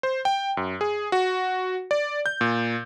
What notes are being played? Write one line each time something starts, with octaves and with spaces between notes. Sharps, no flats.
C5
G5
F#2
G#4
F#4
D5
G6
A#2